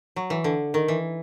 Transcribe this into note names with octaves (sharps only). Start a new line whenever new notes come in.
F#3
E3
D3
D#3
E3